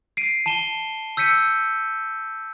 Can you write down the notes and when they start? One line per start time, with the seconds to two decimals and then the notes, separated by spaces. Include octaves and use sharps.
0.17 C7 D7 D#7
0.46 A5 D#7 E7 G7
1.17 E6 G6 B6 C#7 D#7